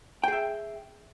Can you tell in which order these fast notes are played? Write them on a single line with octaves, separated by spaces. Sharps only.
G5 G#4 E5